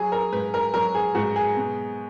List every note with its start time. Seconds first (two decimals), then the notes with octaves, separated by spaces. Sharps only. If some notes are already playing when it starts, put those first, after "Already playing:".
Already playing: F#3 G#4
0.12 A#4
0.32 G#2 B4
0.54 A#4
0.74 F#3 A#4
0.95 G#4
1.15 G#2 F#4
1.36 G#4
1.56 B2